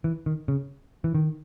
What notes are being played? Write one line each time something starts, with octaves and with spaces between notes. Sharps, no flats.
E3
D#3
C#3
E3
D#3